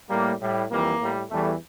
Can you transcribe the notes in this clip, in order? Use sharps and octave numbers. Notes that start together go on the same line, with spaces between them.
A2 G3 A#3
A2 G3
F2 E3 G3 A#3
A2 G3
E2 E3 G3 A3